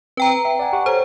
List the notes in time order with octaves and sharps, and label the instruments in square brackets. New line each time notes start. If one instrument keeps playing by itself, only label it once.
[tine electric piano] C4 [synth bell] B4 G5 A#5
[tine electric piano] E5
D5 F#5 G#5
G4 F#5 C#6
[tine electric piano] A4 C#5 A#5 [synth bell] C5